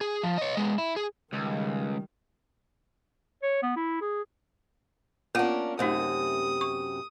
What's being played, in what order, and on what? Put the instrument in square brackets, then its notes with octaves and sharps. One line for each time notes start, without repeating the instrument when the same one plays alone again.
[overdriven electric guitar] G#4
F3
C#5 D#5
G#3 B3
E4
G#4
[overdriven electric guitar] C#2 [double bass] D#3 G3
[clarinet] C#5
B3
E4
G#4
[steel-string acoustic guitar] A#3 D4 [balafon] B3 F4 F#5 [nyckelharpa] C#4
[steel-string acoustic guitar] F#2 C3 [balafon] A3 D#4 [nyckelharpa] D#6
[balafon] C#6